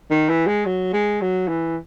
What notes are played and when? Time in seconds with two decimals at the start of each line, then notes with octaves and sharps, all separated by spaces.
0.10 D#3
0.29 E3
0.47 G#3
0.66 F#3
0.93 G#3
1.21 F#3
1.48 E3